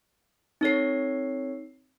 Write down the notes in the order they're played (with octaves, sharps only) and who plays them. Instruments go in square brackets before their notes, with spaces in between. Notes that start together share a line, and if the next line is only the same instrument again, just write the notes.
[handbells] C4 A4 C#5 [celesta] D#4 C7